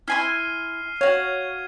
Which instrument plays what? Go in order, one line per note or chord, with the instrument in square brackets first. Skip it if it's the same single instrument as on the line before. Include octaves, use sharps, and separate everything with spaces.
[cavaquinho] E4 G#5 C6 [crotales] F6 C7 D#7
[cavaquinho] F#4 F5 [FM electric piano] C#5 [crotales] G#6